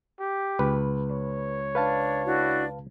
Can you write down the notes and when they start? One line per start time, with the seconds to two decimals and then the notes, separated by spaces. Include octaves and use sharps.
0.20 G4
0.59 C#2 B4
1.11 C#5
1.75 D4 B4 F5 A5
2.25 D4 E4 F#4